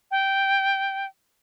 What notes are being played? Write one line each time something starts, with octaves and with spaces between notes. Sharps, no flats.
G5